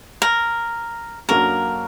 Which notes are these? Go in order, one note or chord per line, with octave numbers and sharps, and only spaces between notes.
A#4
F#2 F#3 A#3 D4 F#4 A#4